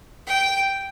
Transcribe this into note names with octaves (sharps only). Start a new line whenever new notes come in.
G5